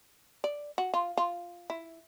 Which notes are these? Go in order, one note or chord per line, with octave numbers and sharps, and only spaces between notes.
D5
F#4
F4
F4
E4